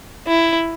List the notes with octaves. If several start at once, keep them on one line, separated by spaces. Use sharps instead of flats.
E4